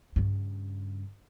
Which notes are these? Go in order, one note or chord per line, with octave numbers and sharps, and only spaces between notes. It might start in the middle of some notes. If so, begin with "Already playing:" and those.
G2 C#3